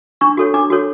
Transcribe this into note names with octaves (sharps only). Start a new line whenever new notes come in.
D4 C#6
F#4 A4 C#5
D4 D6
F#4 A4 C#5